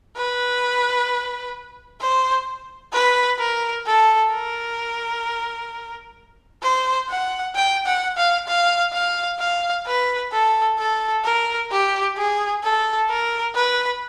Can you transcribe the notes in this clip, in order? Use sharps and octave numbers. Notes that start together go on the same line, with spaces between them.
B4
C5
B4
A#4
A4
A#4
C5
F#5
G5
F#5
F5
F5
F5
F5
B4
A4
A4
A#4
G4
G#4
A4
A#4
B4